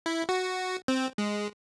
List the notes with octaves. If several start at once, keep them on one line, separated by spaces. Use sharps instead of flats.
E4
F#4
C4
G#3